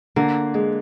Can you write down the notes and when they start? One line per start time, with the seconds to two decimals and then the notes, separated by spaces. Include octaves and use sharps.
0.16 D3 A#3
0.54 G#3